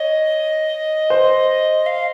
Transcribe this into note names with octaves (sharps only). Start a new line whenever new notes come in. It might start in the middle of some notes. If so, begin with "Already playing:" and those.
Already playing: C#5 D#5
C5
F5